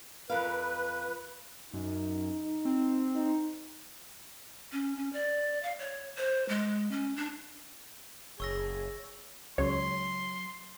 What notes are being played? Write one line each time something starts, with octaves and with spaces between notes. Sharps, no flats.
F2 A#4 B4 F5
F#2 D#4
C4
D#4
C#4
C#4
D5
F5
C#5
C5
G#3
C#4
D4
F#1 G#4 C#5 C#6 E6 A#6
C#2 F#3 C#5 C6